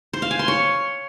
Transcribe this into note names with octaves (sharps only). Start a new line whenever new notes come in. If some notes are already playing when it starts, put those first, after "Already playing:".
C5
F5
G#5
C6
C#5